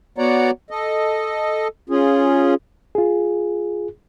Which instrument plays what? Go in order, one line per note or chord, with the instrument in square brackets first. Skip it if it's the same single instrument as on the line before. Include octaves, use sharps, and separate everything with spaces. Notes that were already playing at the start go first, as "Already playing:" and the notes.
[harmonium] B3 F#4 C#5 D5 F#5 A#5
A4 D#5
C#4 F4 G#4
[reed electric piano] F4 G#4